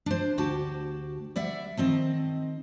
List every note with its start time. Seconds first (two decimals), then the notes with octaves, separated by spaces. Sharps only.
0.06 D4 C5
0.38 D2 F#4 G4 A5
1.36 G3 D5 E5 F#5
1.77 D#3 C4 D#5 A5